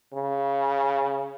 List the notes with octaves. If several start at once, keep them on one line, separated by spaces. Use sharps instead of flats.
C#3